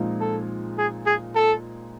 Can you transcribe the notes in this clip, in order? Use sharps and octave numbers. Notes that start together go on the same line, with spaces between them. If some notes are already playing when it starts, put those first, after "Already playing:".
Already playing: A#2 F3 G#3 C4 D#4
A4
G#4
G#4
A4